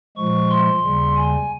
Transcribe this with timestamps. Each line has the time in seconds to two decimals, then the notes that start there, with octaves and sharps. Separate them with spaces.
0.17 A#2 F3 G#3 C#6
0.50 C6
0.83 D#2 C#3 G3
1.16 G#5